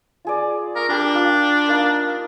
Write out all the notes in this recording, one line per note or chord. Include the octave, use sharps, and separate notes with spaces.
F4 G#4 D5
A#4 C#6 D#6
D4 G4 A#4 B5
F4 F5
A#3 D#4 A#4